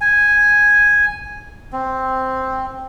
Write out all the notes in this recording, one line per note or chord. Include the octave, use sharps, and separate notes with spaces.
G#5
C4